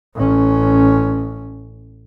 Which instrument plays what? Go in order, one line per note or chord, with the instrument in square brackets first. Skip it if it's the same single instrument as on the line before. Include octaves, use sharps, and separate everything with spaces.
[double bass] A1 C#4